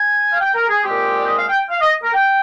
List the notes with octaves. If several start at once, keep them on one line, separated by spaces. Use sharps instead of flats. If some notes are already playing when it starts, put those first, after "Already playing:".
Already playing: G#5
F5
G5
A#4
G#4
A#2 G#3 C4 G4
D5
D#5
F5
G5
F5
D#5
A#4
G5